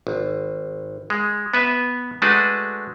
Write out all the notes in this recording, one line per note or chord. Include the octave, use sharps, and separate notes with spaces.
G#1
G#3
B3 B4 E5
G#3 A3 D4 F#4 B4